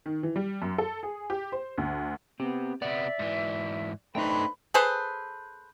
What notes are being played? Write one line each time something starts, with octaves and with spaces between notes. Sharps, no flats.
D#3
E3
G3
F#2
A4
G#4
G4
C5
D2
B3 C4 G4
C3 B3 D5 E5
G#2 E3
A3 D4 D#4 A4 B4 C5 G5
G#4 A4 B4 C5